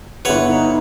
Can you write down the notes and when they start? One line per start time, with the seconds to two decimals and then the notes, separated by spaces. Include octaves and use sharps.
0.25 G1 E4 B4 C#5 F#5 C#6
0.47 D#4